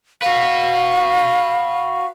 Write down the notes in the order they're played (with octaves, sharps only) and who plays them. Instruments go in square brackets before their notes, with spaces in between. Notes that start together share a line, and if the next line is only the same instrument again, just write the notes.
[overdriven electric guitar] F#4 B4 [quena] F5